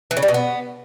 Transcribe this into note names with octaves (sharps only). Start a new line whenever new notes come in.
E3
C#3
G3
B2
B3